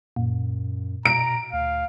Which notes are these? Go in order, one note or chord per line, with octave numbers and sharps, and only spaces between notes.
F#2 A#2
B2 A#5 D7
D2 F5